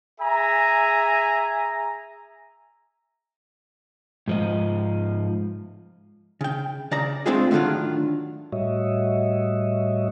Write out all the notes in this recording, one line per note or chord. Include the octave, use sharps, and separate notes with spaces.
G#4 E5 G#5 A#5
G#2 F3 D#5
C#3 G5
C#3 D5 A#5
G#3 A3 C4 D4 F4 G#4
A2 D3 D#3 F#3 D4 F4
A2 G3 F#4 C#5 D#5 E5